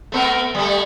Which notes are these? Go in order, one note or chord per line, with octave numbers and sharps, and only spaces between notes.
A3 B3 A#4
G3 A3